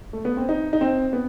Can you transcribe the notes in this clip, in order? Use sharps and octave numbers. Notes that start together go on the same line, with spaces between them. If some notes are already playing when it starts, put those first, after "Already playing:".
A3
B3
C4
D#4
D#4
C4
B3